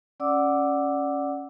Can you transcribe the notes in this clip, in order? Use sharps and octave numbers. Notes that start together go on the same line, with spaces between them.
C#4 D5 F#5 D6 E6